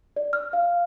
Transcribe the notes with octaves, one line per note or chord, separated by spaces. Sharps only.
D5
F6
F5